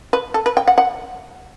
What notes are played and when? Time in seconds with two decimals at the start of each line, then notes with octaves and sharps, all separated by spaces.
0.13 B4
0.34 A4
0.46 B4
0.57 G5
0.68 F#5
0.78 F#5